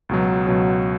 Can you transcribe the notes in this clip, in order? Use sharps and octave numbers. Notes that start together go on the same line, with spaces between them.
C#2 B2 F#3
C#2 B2 F#3